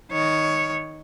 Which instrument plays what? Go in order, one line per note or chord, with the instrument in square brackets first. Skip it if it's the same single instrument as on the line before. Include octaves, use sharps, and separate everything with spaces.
[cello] D#3 C#5